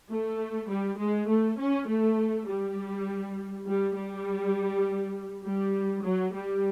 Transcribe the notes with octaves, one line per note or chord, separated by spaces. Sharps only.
A3
G3
G#3
A3
C#4
A3
G3
G3
G3
G3
F#3
G3